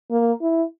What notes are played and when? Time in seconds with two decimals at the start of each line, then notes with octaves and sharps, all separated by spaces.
0.11 A#3
0.42 E4